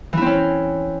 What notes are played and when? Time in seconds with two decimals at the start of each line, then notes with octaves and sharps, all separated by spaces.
0.13 E3
0.17 E4
0.22 C4
0.26 C#4